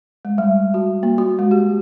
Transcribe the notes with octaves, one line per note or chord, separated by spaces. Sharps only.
G#3
G3
F#4
A#3
F#4
G#3
G4